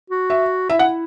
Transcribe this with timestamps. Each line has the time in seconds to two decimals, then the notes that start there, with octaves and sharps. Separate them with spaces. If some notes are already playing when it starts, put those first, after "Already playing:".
0.10 F#4
0.30 E5
0.70 E4 E5
0.79 F#5